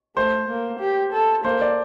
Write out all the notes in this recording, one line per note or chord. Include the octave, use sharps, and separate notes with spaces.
A3 C5
A#3
G4
A4
A#3 C5
D5